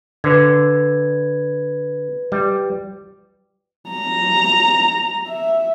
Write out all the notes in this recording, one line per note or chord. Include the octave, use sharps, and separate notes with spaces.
D3 B4 G#6
G3
A#5
E5